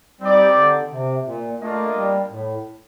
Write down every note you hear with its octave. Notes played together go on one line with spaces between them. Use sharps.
G3 C4 D#4 G4 D5 G5
D3
C3
A#2
A3 A#3 D4 F4 A#4 D#5
G3
A2